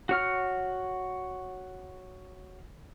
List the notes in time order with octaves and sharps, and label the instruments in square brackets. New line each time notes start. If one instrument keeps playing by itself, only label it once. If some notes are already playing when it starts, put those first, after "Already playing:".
[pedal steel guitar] F#4 C#5 F6